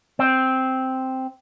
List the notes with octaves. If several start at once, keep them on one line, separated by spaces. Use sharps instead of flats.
C4